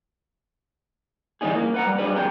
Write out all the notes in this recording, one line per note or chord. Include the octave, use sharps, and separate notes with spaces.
E3 G3 B3 C#4 D#4 G#4
A#3
B4 F#5 A#5
G3
D4 G#4 B4
F#2 A#3 C#4 G4 G5 A#5